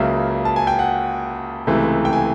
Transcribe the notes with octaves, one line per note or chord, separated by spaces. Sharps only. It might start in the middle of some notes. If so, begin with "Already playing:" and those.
Already playing: C#2 C#3 F#3 A#3 E5
A5
G#5
G5
F#5
C#2 C3 E3 A3
G5
G#5